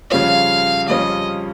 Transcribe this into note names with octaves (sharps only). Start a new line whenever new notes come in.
F2 C#3 G3 C#4 F4 F5
F2 C#3 G3 C#4 F4 D#5